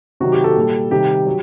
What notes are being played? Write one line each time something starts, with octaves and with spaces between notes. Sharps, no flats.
C3 D#3 F#3 F#4
G4
A4
A#2 G3
C3 D#3 G3 G4
F#3